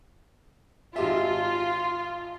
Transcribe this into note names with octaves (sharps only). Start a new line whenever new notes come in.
G#1 F4 G4 E5